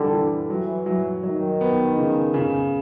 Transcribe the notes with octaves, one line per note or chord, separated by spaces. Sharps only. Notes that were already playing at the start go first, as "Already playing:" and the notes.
Already playing: D3 E3 G3
E3
E3 F#3
F#3
D#3 F#3
B3
C#3
C#3